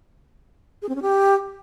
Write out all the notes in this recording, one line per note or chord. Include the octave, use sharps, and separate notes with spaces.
G#4
C4
C#4
G4